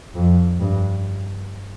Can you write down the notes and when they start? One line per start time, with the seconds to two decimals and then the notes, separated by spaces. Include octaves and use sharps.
0.15 F2
0.60 G2